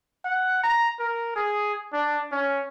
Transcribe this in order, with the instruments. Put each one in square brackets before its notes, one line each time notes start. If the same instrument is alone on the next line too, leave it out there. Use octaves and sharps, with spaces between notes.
[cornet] F#5
A#5
A#4
G#4
D4
C#4